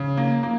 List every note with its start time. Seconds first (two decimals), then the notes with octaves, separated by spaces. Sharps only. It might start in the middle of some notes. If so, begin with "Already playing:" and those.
Already playing: C#3
0.17 A#3
0.43 A#3